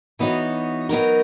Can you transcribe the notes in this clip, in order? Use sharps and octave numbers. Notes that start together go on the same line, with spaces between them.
E3 B3 D#4 F#4 C#5
F#3 B3 D#4 A#4